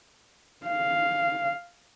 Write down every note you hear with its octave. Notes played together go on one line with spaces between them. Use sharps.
F5